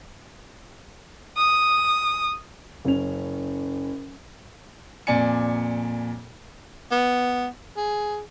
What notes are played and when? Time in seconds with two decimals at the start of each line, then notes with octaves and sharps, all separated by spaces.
1.37 D#6
2.85 F#1 C#4 F7
5.07 F2 A#2 D5 G#5 C#7
6.92 B3
7.77 G#4